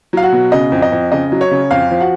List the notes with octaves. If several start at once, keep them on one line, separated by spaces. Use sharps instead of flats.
F#3 F5
F#4 F#5
B2
C#3 D#5
F2
D#5
F2
C#3 D#5
F#3
C#5
C#3
F2 F4 F5
F3
F#4 F#5